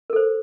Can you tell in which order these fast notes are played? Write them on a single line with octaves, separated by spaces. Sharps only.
A#4 A4 C5